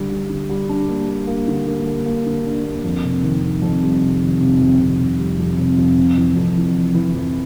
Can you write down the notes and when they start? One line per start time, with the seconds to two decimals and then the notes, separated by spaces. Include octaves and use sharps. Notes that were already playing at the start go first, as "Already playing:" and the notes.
Already playing: D3 G3
0.10 G3
0.29 D3
0.49 G3
0.69 D4
0.88 A#3
1.09 D4
1.27 A#3
1.48 D3
1.67 A#3
1.86 A#3
2.06 A#3
2.26 D3
2.46 D4
2.64 A#3
2.84 F2
3.04 C3
3.23 D#3
3.43 D#3
3.62 F2
3.82 G3
4.02 C3
4.21 D#3
4.41 C3
4.60 F2
4.80 C3
5.00 C3
5.19 G3
5.39 F2
5.59 C3
5.78 F2
5.98 C3
6.17 E3
6.36 F2
6.57 E3
6.75 E3
6.95 E3
7.15 F2